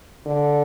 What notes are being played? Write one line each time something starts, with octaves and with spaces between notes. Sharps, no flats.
D3